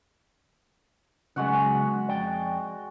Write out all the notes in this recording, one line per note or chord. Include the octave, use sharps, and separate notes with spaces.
C#3 F#3 G#3 B3 F#4 F#5
F2 D5 G5